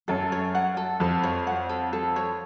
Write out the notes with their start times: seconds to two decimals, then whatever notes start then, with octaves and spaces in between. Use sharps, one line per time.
0.08 F#2 A4
0.32 C#5
0.55 F#5
0.77 A4
1.00 F2 A4
1.23 C#5
1.47 F#5
1.69 A4
1.93 A4
2.16 C#5